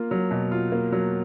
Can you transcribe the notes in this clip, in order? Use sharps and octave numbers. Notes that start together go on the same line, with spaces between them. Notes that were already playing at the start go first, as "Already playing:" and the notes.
Already playing: A#3 F4
F#3
B2
F4
A#3
F#3